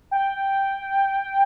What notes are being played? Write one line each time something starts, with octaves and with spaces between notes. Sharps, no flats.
G5